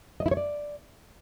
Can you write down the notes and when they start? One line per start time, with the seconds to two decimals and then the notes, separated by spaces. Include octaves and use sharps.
0.20 D#5
0.26 E4
0.31 C#5
0.37 D5